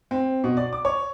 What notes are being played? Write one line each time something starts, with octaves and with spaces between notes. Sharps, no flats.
C4
B2
D5
D6
C#5